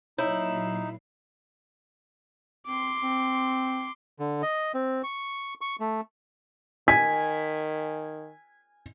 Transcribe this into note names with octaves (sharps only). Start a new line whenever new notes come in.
A#2 F#3 D#4 E4 C#5 C7
C4 C6 D6
C4
D3
D#5
C4
C#6
C#6
A3
D#3 G#5 B6